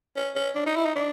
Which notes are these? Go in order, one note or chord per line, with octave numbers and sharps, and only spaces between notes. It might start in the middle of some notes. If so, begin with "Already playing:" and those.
C#4
C#4
D4
D#4
E4
D#4
D4